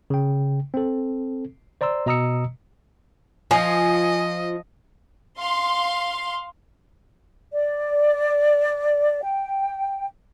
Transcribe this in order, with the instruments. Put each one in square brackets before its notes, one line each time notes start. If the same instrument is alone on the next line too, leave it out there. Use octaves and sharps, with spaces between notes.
[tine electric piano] C#3 G5
C4 A4
C5 D5 A#5 C6 E6
B2 D#5 A#5 D#6 E6 C#7
[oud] F3 [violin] D#5 [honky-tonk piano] G#5
[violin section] F5 C6
[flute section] D5
G5